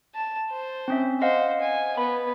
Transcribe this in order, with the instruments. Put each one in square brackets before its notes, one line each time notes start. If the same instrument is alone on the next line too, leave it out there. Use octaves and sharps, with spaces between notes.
[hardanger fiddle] A5
C5
[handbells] C4 C#4 E5
[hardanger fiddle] C5 [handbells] D#5 F5 F#5
[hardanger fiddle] G#5
[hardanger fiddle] B3 [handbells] B5